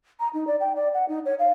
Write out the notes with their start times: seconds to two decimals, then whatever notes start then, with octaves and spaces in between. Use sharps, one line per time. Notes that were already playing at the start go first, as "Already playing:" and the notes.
0.20 A#5
0.34 D#4
0.47 D5
0.60 G5
0.76 D5
0.94 F#5
1.09 D#4
1.25 C#5
1.39 F5